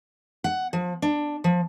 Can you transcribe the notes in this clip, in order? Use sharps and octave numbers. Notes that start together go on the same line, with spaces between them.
F#5
F3
D4
F3